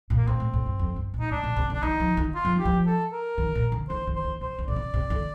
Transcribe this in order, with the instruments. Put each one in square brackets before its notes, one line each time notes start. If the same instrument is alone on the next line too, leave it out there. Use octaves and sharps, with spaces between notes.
[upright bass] A#2
[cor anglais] A#3
[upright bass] A#2 [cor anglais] C4
[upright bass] A2
A2
G2
F2
G2
A#2
[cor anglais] D#4
[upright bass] A2 [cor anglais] D4
[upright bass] A#2
C3
C3
[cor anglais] D4
[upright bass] D#3 [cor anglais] D#4
[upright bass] F3
D#3
[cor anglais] F4
[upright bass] F3
[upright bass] D#3 [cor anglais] G4
[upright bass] F3
[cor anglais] A4
A#4
[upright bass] D#3
A#2
D3
[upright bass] D#3 [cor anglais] C5
[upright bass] D#3
[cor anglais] C5
[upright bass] D#3
[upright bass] C3 [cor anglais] C5
[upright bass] D#3
[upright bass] A#2 [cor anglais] D5
[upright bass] C3
C3
D3